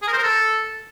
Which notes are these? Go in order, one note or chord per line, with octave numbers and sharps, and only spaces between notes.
G#4
A#4
C5
A#4
A4